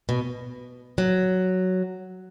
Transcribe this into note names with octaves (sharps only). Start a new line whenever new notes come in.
B2
F#3